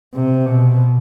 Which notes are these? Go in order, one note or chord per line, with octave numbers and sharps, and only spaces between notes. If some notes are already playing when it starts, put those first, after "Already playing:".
C3
B2